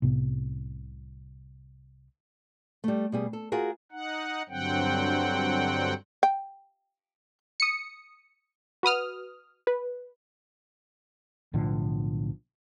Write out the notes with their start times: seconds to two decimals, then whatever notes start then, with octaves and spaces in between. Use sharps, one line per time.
0.02 C2 A2 C3 B3
2.84 G3 A3
3.12 B2 G3 G#4
3.33 A4
3.52 F4 F#4 G#4 A#4
3.92 D#4 F#5
4.49 G2 D3 F#3 C4 F#5 G5
6.23 G5
7.60 D#6 C#7
8.83 F#4 B4 D#6 F6
9.67 B4
11.53 B1 A2 D3 F3